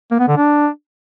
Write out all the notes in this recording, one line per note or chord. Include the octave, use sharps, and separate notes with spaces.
A#3
B3
D3
D4